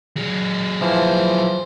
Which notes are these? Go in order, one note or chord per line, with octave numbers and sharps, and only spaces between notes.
F#3 G#3
E3 F3 C5